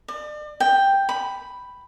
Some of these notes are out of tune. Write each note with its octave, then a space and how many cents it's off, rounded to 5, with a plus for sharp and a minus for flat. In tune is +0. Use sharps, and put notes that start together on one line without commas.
D5 +40
G5 +5
B5 +5